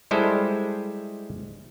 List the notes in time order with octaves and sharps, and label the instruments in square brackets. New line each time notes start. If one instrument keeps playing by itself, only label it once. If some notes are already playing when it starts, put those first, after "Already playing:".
[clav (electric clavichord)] G3 G#3 E4 A4 C5